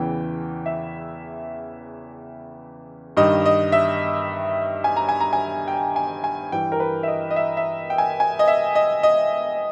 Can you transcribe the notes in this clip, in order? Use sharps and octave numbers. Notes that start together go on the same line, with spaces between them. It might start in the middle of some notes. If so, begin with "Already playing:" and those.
Already playing: E2 C#3 E3 G5
E5
G2 D#3 D#5
D#5
E5
G#5
A#5
G#5
A#5
G#5
G5
G#5
G#5
G2 E3 G5
A#4
B4
E5
D#5
D#5
E5
E5
G5
G#5
G#5
D#5
E5
D#5
D#5